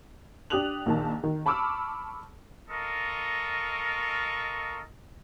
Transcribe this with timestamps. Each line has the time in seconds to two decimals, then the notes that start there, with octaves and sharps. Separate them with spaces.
0.50 D4 G4 D#6 F#6 F7 F#7
0.86 A#1 D#3 A5
1.24 D#3
1.46 A5 B5 C#6 D6 E6 F6
2.70 F4 A4 A#4 D#5 C#6